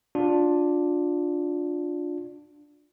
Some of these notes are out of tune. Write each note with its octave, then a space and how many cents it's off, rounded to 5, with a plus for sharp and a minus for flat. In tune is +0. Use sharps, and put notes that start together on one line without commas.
D4 +0 F4 +25